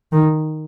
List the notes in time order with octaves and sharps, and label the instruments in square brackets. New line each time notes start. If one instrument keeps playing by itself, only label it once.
[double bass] D#3